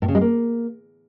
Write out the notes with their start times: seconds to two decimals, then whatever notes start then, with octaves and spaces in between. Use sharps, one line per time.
0.02 A2
0.08 C#3
0.15 G#3
0.21 A#3